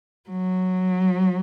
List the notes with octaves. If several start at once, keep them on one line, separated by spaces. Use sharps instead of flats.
F#3